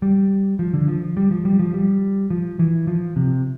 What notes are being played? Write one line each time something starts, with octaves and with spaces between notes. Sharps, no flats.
G3
F3
D3
F3
G3
F3
G3
F3
G3
F3
E3
F3
C3